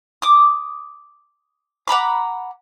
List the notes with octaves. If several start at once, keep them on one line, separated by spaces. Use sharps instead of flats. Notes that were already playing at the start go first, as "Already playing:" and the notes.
D6 D#6
F#5 A#5 B5 D6